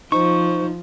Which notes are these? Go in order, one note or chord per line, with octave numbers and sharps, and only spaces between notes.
F3 D#4 C5 C#6